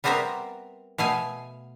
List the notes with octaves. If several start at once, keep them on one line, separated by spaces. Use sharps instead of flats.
G3 B3 C4 A#4 E5 A#5
B2 A3 F5 G#5